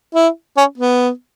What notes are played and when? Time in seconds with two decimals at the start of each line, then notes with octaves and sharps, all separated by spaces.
0.15 E4
0.57 C#4
0.78 B3